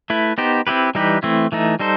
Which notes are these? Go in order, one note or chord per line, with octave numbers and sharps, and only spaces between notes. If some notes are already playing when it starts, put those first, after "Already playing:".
A3 E4 B4
B3 D#4 G4 C5
C4 E4 G4 B4
E3 G3 D#4 G4 B4
E3 A3 C4 E4
E3 A3 D#4
G3 D#4 A4 C5